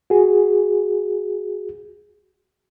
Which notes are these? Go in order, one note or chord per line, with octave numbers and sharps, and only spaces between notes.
F#4 G#4